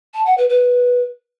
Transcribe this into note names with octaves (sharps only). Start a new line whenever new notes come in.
A5
F#5
B4
B4